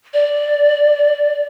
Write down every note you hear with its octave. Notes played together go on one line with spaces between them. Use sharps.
D5